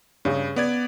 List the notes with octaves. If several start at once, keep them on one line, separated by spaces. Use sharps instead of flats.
G2 C#3 C#4
B3 D5 G#6